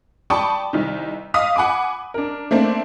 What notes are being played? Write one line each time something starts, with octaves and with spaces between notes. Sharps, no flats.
D5 G5 A5 B5 C#6 D#6
C2 D#3
D#5 F5 D#6 B6
F#5 G#5 B5 D6
D4 A#4
A3 A#3 C4 D4